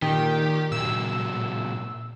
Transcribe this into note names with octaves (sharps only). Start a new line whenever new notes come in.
A#2 D#3 G4
A#2 F#3 E6